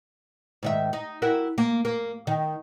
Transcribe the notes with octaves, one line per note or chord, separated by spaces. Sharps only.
G#2 D#3 E5
D#4
E4 F#4 A#4
A#3
A#3
D#3